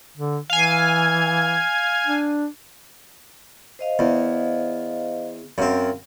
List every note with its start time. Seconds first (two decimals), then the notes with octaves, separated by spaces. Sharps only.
0.17 D3
0.50 E3 F5 G#5
2.04 D4
3.79 C5 D#5 F5
3.99 E2
5.58 F#2 C4 F5